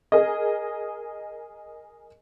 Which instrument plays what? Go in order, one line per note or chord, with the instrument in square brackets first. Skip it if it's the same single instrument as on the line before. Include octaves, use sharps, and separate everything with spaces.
[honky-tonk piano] G#4 A#4 D#5